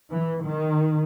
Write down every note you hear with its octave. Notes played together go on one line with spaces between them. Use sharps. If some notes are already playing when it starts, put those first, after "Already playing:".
E3
D#3